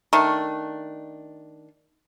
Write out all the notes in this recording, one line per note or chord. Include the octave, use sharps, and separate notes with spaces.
D#3 A3 D4